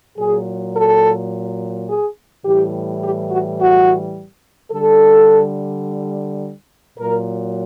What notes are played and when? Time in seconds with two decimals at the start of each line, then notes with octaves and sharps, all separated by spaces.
0.17 A#2 F#3 G#4
0.74 A4
1.87 G#4
2.44 A2 E3 G3 G4
3.01 G4
3.29 F#4
3.58 F#4
4.71 D3 G3 A4
6.98 A#2 F#3 A#4